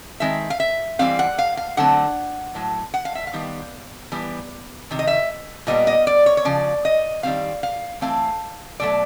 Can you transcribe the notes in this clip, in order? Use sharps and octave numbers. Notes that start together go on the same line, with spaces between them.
D#3 G#3 C4 E5
F5
E5
E3 G3 C4 F5
F#5
F5
F5
D3 F#3 A3 C4 F#5
A2 F#3
F#5
F5
E5
F5
D#3 G3 B3
E3 G3 B3
C3 D#3
D#5
E5
A#2 G3 B3 D#5
D#5
D5
C#5
C#5
C#3 F3 D5
D#5
D#3 G3 C4 F5
F5
E3 A3 C4 F5
B2 F#3 A3 D5